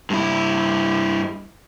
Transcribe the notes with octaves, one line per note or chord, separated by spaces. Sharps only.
G2 E4